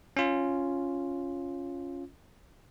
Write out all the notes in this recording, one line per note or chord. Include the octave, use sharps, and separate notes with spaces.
C#4 F4